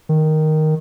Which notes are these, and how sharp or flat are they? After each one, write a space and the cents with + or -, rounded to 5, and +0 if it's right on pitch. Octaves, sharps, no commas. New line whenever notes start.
D#3 +0